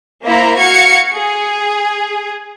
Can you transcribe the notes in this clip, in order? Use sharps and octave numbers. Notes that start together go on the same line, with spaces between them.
A#3 E4 C5 A#5
F#4 F5 G#6 C#7
G#4